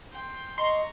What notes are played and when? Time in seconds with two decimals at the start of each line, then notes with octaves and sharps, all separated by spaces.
0.12 G5 C6
0.58 D#5 A#5 C6 C#6